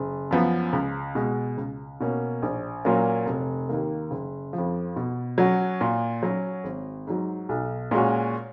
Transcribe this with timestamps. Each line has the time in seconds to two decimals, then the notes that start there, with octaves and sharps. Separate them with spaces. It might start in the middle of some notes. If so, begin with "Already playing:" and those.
Already playing: F#1
0.31 F#2 F3 B3
0.73 C#2
1.15 B2 G#3
1.57 C#2
2.00 B2 A#3 C#4
2.42 A#1
2.85 A#2 F#3 A#3 C#4
3.26 F1
3.69 D#2 D#3 A#3
4.11 F#1
4.53 F2 F3
4.96 B2
5.38 F#3 C#4 F#4
5.81 A#2
6.23 F#3 C#4 F#4
6.64 G#1
7.07 G#2 F#3
7.49 B1
7.91 A#2 G#3 C#4 F#4